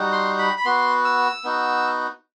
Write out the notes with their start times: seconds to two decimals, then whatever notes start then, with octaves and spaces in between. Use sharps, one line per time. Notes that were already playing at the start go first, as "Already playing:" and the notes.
Already playing: G3 D#4 F#4
0.12 C6
0.39 B5
0.57 B5
0.65 B3 F#4 C6
1.05 E6
1.44 B3 D#4 F#4